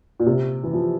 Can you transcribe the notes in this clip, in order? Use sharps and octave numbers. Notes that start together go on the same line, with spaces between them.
A#2
C3
E3
F3